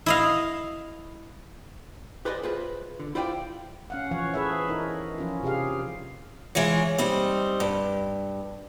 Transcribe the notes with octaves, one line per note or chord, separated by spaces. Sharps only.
E4 D#5 F5
G4 B4 C5 D5 D#5 G#5
F4 G#4 B4 C5 E5
D3
E4 F4 C5 D5 F5 G5
C#4 F5 F#5
E3 F3 C#5 F5
G#4 A4 B4 C#5 E5
D#4 E4 A#4
F3 C#4 F4
C3 G4 G#4 F5
E3 G#3 F4 C#5
G3 C4 D#4
G2